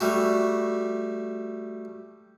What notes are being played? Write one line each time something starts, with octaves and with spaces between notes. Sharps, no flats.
G3 A3 F#4